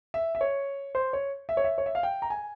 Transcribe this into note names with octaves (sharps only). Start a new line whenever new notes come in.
E5
E5
C#5
C5
C#5
E5
C#5
E5
C#5
E5
F5
G5
A#5
G#5